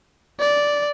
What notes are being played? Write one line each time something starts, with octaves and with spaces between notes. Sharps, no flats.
D5